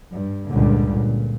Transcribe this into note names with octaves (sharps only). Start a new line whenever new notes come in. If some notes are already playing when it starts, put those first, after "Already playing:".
G2
C#2 G2 A#2 D3
A#2